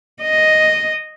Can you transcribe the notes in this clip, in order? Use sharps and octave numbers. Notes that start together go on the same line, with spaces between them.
D#5